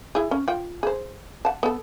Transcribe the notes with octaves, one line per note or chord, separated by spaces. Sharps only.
E4 G#4
C#4
F4 G5
G#4 C5
F#5 A5
B3 A4